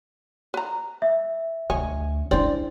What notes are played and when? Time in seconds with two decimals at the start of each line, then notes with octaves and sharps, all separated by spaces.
0.54 B4 A#5
1.02 E5
1.70 D2 C#5 D#5 G#5
2.31 C4 D4 E4 G#4 D5